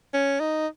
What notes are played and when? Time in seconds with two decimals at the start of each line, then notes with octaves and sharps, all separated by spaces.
0.13 C#4
0.40 D#4